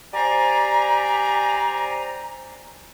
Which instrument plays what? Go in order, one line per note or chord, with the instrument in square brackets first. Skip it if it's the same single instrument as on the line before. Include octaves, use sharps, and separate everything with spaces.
[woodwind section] G4 C5 D5 G#5 A#5